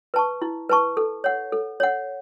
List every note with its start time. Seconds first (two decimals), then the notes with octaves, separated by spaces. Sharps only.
0.14 B4 A5 C#6
0.42 E4
0.69 B4 A5 C#6
0.97 A4
1.24 C#5 F#5
1.52 A4
1.80 C#5 F#5